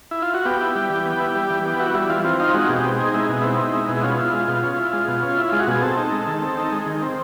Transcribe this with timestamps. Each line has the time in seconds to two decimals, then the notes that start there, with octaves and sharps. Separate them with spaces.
0.11 E4
0.22 F4
0.34 F#4
0.45 B3 G4
0.61 E4
0.75 G3
0.90 E3
1.05 B3
1.20 E4
1.35 G3
1.50 E3
1.65 B3
1.80 E4 F#4
1.95 G3 E4
2.09 E3 F4
2.24 C4 F4
2.40 D#4 F4
2.54 G#3 F#4
2.69 B2 G4
2.84 C4
2.92 G#4
2.99 D#4
3.14 G#3 E4
3.29 B2
3.41 C4 E4
3.59 D#4
3.74 G#3
3.89 B2
3.97 E4
4.03 C#4 F4
4.18 E4
4.33 G#3
4.48 B2 F4
4.63 C#4
4.78 E4
4.93 G#3
5.08 B2
5.22 C#4
5.38 E4
5.49 G#3 F4
5.60 F#4
5.67 B2 G#4
5.82 C4 A4
5.97 D#4
6.12 G#3
6.27 D#3
6.42 C4
6.57 D#4
6.72 G#3
6.86 D#3
7.02 C4